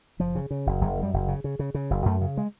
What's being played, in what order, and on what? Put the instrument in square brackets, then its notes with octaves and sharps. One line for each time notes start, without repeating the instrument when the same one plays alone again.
[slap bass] F#1 F3
C#3
C#3
F#1
F#1 F#3
F#2
G3
F#1
C#3
C#3
C#3
C#3
F#1
F#2 A3
C#3
G#3